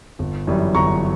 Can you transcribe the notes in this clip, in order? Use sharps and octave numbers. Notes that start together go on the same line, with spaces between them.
G1
F#2 E3 G3
G1 A#5 C#6